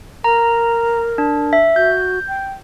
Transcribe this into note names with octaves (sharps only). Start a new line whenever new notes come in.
A#4 A#5
D4
E5
F#4 G6
G5